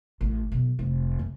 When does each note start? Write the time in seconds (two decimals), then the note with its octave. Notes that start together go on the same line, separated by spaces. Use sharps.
0.21 A1
0.52 B1
0.79 F1
1.19 C#3